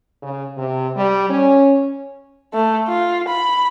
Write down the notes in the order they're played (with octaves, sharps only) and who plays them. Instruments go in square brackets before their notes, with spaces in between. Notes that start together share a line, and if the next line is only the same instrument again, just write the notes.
[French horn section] C#3
C3
G3
C#4
[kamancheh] A3
F4
B5